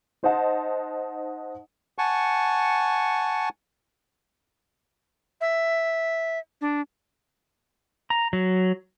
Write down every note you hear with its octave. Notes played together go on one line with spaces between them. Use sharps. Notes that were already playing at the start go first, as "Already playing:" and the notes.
D#4 C5 D#5 F#5 A5
F#5 G#5 A5 C#6
E5
D4
A#5
F#3